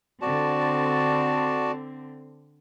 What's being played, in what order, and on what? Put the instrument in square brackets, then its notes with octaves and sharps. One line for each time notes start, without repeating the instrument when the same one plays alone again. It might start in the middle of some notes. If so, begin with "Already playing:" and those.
[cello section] D3 C4 [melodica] F#4 D5 A5